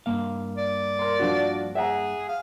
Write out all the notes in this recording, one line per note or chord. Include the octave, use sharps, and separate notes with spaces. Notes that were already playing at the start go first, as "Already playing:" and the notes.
G2 A#3 F5
D5
A#4 C6
F3 D4 F#4
G#4 E5 F#5 A#5
F5